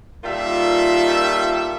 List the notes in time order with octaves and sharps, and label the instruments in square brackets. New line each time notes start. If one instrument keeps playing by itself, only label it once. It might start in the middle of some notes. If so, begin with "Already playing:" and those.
[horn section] A#2 D#3 G3 F4 A4 E5